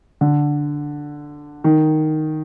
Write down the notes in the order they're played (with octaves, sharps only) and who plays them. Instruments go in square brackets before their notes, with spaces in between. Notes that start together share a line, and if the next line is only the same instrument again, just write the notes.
[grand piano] D3
D#3